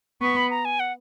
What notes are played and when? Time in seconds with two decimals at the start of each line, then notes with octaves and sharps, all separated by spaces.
0.21 B3 C#6
0.36 B5
0.50 A#5
0.65 G#5
0.80 F#5